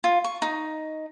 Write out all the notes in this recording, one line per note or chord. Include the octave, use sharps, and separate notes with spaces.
F4
C#6
D#4